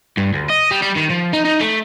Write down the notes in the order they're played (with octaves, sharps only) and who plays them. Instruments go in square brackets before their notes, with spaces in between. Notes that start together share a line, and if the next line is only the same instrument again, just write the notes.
[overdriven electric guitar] G2
D2
D#5
G3
G3
D#3
F3
D#4
D#4
A3